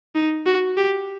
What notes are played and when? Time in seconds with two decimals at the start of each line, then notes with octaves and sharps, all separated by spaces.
0.15 D#4
0.46 F#4
0.77 G4